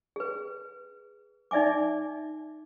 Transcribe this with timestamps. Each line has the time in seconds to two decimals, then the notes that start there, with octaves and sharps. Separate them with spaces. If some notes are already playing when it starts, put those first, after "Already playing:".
0.16 G#4 B4
1.51 D#4 D5 E5 G#5 D6